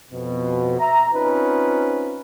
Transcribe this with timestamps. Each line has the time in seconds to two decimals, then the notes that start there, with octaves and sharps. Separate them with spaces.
0.12 F2 B2
0.80 E5 A#5
1.14 C4 C#4 D#4 F4 B4